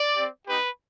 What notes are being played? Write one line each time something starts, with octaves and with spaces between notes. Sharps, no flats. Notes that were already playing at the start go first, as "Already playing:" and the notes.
Already playing: D5
C4 G4
B3 D#4 G4 B4